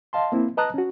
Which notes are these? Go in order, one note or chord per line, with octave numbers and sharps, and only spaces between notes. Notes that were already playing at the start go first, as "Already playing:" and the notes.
D#5 F5 A5 C6
A#3 C4 E4
B4 D#5 A5 A#5 D#6 F#6
C#4 F#4